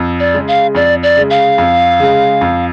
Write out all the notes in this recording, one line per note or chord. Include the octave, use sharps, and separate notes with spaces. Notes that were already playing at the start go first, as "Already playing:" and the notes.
Already playing: F2
D5
C#3 G#3
F5
F2 D5
D5
C#3 G#3
F5
F2
C#3 G#3
F2